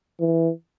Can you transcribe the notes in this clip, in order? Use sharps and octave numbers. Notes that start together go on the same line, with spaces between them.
E3